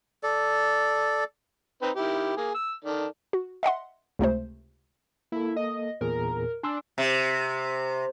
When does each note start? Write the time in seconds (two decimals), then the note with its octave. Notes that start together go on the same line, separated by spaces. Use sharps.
0.23 A4 D5
1.82 C4 D#4 B4
1.96 D#3 E4 G4
2.37 A#3 G#4
2.55 E6
2.85 D#3 A4 D5
3.33 F#4
3.63 D#5 E5 F#5 C6
4.19 C#2 C3 A3 C5
5.32 A#3 E4 A4
5.56 D#5
6.01 E2 A#2 G#4 A#4
6.63 D4 G#5 C6 E6
6.98 C3